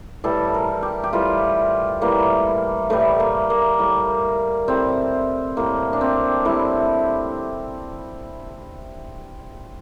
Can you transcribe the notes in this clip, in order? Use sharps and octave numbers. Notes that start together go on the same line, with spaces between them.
A2 E3 G3 A4
A#4
G4
G4
A2 E3 G3 F4
A2 E3 G3 A#3
A2 E3 G3 A3
A#3
A#3
A2 G3
A2 G3 C4
A2 G3 A#3
D4
C4
A2 G3 E4